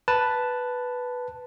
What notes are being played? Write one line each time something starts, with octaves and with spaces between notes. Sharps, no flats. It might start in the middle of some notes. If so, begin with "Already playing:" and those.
B4 A5